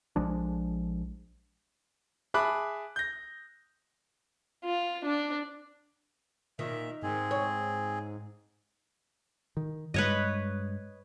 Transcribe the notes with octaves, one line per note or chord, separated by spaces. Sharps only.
A#1 F3 G#3 D4
G#4 E5 A5 B5 D6 F#6
G6 A#6
F4
D4
A#2 D#3 E5
G#2 C4 G#4
C#5
D#3
G2 G#3 B4 C#5 D#5